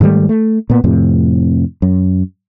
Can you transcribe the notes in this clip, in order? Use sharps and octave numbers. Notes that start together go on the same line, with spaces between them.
G#2 D#3 G3 A3
A3
A#2 B3
F2 A2 C3
F#2